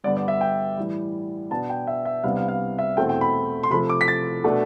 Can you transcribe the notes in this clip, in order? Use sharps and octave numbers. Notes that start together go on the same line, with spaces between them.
G2 D3 G3 B3 D5
D5
E5
G5
A2 E3 G3
B2 B3 D4 A5
G5
E5
E5
C2 C3 G3 B3 D4 F5
F5
F5
E5
E2 B2 A3 C4 G5
G5
B5
C6
C3 F3 A3 B5
D6
B6
A6
B2 A3 D4